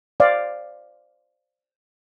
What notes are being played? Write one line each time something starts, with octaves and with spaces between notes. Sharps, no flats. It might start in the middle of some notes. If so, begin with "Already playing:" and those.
C5 D5 F5